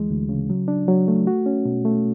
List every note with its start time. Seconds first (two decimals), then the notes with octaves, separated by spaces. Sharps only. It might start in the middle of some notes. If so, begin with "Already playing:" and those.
Already playing: D2 E3 G#3
0.11 D2
0.29 C#3
0.50 F#3
0.68 D4
0.88 F#3
1.08 A3
1.27 F#4
1.46 C#4
1.65 B2
1.85 A3